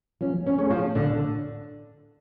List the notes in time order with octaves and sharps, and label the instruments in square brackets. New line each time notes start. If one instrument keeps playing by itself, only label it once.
[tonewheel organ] F3 [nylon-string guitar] C#4
[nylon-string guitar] C#4
[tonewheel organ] A3 C#4 G#4 C#5
[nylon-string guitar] F3
[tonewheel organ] A2 [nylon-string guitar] D3